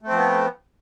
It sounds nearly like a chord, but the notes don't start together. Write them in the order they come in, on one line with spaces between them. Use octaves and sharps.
A3 C4 F3 B3